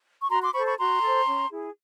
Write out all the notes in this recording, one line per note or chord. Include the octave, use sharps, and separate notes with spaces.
C#6
F#4 A#5 C6
C6 D6
A4 C5 B5 C#6
B5 C#6
F#4 A#5 C6
A4 C5
C#4
E4 G#4